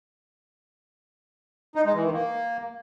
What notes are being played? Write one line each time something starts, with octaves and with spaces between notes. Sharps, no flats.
D#4
G#3
E3
D#3
A#3